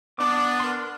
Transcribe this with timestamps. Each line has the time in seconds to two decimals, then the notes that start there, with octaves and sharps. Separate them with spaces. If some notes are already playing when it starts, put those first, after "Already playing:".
0.19 B3 D4 D6
0.60 A#4 C6